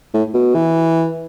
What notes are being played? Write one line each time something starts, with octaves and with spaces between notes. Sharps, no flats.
A2
B2
E3